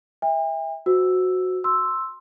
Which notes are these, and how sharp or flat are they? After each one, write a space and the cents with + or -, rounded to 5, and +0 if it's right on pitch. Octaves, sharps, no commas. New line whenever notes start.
E5 -15 G5 +45
F#4 -5 C5 -30 E6 +0
C6 +5 E6 +0